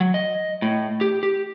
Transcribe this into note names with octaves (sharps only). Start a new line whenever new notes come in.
F#3
D#5
A2
G4
G4